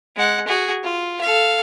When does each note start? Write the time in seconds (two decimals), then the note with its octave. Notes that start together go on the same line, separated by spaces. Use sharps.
0.16 G#3 F#5
0.48 F#4 G#4
0.83 F4
1.21 A4 F5